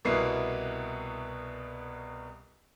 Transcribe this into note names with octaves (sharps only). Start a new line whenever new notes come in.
C2 B2 A#3 B3 E4 C7